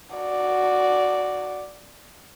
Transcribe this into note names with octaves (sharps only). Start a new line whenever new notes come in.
F#4 D5